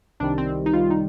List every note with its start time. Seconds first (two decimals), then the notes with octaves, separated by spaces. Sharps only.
0.20 C2 C3 D#3 G3 D4
0.38 C4
0.66 D#4
0.73 C2 C3 D#3 G3 F4
0.90 D#4